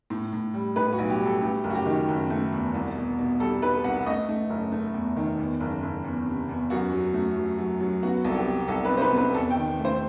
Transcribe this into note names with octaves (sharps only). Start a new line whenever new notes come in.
A2
A2
G3
A2 B4
F#4
B1
G4
G3
A4
A3 G4
F#1
F#4
G4
D#3
F#1
A3
E2
C2
B2
B2
G3 A4
G3 B4
C2 F#5
A3 D#5
A3
F#1
A3
E2
D#3
E2
F#1
F#1
E2
C3
E2
F#2 F#4
F#3
A3
F#3
F#3
F#3
B3 F#4
C2 A4
G4
C3
C2 A4
B4
C3
C5
B4
C3
B4
E2 A4
G5
D#3
A3
C5